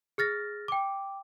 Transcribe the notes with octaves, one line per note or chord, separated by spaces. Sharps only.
G#4 F6 A6 A#6
G5 D6